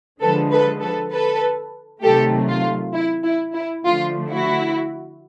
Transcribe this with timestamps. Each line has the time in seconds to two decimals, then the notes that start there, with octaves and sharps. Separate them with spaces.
0.21 D3 F3 G#3 A4 B4
0.51 A4 B4
0.82 A4 B4
1.12 A4 B4
2.02 C3 D#3 F#3 A3 G4 A4
2.48 F4
2.94 E4
3.24 E4
3.54 E4
3.84 D3 F3 A3 F4
4.30 E4 F#4